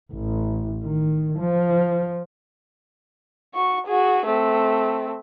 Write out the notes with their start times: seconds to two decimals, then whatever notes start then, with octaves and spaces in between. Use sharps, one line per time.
0.13 A1
0.84 D#3
1.39 F3
3.55 F#4 C#6
3.87 F#4 G#4
4.26 A3 C4